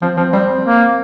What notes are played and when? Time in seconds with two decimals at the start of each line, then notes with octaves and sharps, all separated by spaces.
0.02 F3 C4
0.17 F3 C4
0.33 G3 C4
0.65 A#3